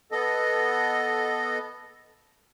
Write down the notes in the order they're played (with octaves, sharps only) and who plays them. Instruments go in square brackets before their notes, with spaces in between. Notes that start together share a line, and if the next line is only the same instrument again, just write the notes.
[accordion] B3 A4 D#5